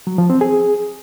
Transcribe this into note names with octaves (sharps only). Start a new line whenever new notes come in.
F#3
F3
C4
G#4